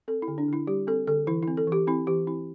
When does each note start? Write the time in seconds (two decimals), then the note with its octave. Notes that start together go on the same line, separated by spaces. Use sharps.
0.08 C4 A4
0.22 E4
0.28 D3
0.38 D4
0.48 D3 E4
0.67 G3 G4
0.87 C4 A4
1.07 D3 A4
1.27 E3 E4
1.43 E4
1.48 C4
1.57 A4
1.67 E3 G4
1.87 C4 E4
2.07 E3 G4
2.27 C4 E4